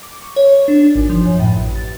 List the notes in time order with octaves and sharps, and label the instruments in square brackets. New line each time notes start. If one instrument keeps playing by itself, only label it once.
[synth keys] D6
C#6
C#5
D4
G#1
F3
F#2
A2
A1
A6